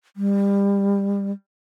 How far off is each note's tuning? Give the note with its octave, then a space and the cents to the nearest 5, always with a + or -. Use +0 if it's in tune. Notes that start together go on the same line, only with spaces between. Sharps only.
G3 +25